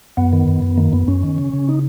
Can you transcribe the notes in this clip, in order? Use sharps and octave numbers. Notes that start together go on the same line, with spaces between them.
F#2 B3
D#3
F#2
F#2
D#3 A#3
F#2 B3
F#2 C#4
D#3
C#3
C#3
D#4